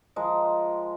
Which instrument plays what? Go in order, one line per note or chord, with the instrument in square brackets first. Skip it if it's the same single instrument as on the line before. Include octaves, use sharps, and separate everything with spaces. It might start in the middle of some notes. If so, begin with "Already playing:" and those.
[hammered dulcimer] F3 G#3 A#4